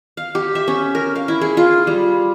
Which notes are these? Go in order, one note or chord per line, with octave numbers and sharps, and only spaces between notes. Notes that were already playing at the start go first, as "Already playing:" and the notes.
F5
G4
E5
C#4
A#4
F5
E4
G#4
F4
G3